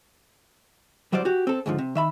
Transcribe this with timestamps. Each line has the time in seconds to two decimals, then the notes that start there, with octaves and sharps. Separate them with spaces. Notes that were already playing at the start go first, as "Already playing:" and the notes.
1.12 C2 F#3 G3 C5 D5
1.25 F#4 G4
1.47 C4 A4
1.66 C#2 G#2 D3 F3
1.79 C3
1.95 D#3 E5 B5